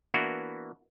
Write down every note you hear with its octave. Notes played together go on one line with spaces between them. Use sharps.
E3 A#3 B3 D4 E4 F#4